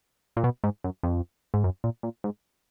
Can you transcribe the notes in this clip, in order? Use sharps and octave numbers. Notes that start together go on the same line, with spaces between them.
A#2
B2
G#2
F#2
F2
G#2
F#2
A#2
A#2
G#2